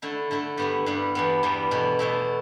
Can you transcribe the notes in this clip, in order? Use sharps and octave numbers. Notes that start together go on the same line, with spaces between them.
D3 A3 E4
D3 A3 E4
G2 G3 B3 E4
G2 G3 B3 E4
E2 E3 G3 B3
E2 E3 G3 B3
E2 B2 A3 E4
E2 B2 A3 E4